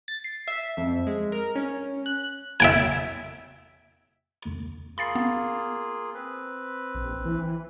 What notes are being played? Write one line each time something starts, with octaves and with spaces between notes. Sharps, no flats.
A6
C7
E5
F2
G#3
A#4
C#4
F#6
E5 G5 G#5
A#3 F4 G#4 B5 A6 C7
B3
C4 B4
A#1
E3